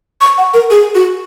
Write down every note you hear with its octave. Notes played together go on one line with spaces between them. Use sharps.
C#6
F#5
A#4
G#4
F#4